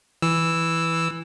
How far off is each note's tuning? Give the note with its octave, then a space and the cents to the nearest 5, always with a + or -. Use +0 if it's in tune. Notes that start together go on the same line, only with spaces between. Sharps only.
E3 +0 E6 +0